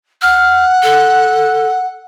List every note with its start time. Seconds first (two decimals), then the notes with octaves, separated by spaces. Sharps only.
0.22 F#5 F6
0.83 A4